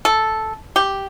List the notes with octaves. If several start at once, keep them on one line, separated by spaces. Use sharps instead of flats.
A4
G4